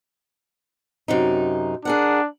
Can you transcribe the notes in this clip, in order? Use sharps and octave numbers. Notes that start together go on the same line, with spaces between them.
F#2 C3 D#4
D4 G#4 A#4 F#5